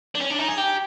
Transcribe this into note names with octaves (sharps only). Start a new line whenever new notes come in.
D4
C#4
D4
D#4
G#4
G4